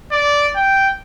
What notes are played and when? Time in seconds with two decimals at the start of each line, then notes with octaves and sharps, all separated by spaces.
0.12 D5
0.56 G5